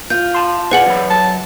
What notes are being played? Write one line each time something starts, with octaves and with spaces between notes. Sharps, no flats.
F4 G6
A5 C6
F4 G#4 B4 C5 D5 F#5 F#7
F#2 E3 C5 B5
F#3 A5